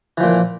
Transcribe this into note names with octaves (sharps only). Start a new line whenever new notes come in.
A#2 E3 F3